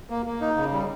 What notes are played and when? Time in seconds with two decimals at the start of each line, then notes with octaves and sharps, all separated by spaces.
0.10 A#3
0.26 A#3
0.41 D#4
0.57 C#3
0.72 G3